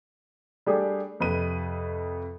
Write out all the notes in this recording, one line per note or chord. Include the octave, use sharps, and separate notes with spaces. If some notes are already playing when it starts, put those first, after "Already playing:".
G3 A3 D4 G4 G#4
F2 C3 B4 D#7